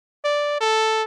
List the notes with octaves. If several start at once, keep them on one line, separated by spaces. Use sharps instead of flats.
D5
A4